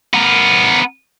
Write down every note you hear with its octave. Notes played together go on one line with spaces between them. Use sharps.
B3 A#4